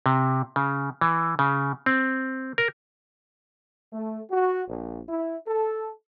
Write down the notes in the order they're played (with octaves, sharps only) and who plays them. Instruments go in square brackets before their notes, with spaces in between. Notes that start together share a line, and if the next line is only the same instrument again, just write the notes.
[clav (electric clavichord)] C3
C#3
E3
C#3
C4
A#4
[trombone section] A3
F#4
A#1
E4
A4